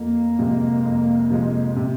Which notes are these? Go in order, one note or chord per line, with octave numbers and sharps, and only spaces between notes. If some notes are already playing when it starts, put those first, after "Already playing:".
Already playing: F2 A#3
C3 F3 G#3
F2
C3 F3 G#3
C3